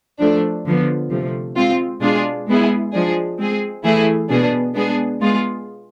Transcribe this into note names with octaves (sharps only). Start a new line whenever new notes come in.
F3 A3 D4
D3 F3 B3
C3 F3 A3
G#3 C4 F4
B2 G#3 D4 F4 G#4
G#3 B3 E4 G#4
F3 G#3 D4 G#4
G#3 C4 G#4
E3 A3 E4 G#4
B2 B3 D4 G#4
G#3 B3 D4 G#4
G#3 B3 F4 G#4